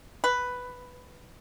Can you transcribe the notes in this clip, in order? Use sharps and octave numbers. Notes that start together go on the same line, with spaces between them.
B4